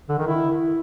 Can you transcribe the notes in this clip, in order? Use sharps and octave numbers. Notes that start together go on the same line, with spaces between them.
D3
D#3
E4